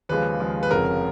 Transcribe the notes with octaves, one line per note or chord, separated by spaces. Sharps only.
D#2 C#3 F3 G#3 B4
D#2 C#3 F3 G#3
B4
F1 F2 C#3 F3 A#4